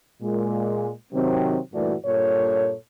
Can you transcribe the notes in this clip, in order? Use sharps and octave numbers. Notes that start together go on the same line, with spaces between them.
A#2 G#3
C3 D#3 F#3 C4
G2 A#2 E3 A3 F#4 D5
G2 A#2 A4 C#5